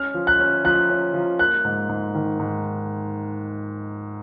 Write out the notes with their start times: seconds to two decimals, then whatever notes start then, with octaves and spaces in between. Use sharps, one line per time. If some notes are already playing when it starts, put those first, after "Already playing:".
Already playing: C#4 F6
0.14 F3
0.27 F#6
0.39 C#4
0.64 F3 F#6
0.90 C#4
1.14 F3
1.39 A#3 F#6
1.65 G#2
1.89 G#2
2.15 D#3
2.39 G#2